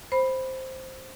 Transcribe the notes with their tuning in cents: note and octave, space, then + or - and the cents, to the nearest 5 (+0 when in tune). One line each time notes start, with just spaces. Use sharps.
C5 +0 B5 +0